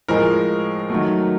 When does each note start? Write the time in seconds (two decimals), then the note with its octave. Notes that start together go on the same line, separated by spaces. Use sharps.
0.08 A2 F3 G#3 A#4
0.90 D#3 F#3 A3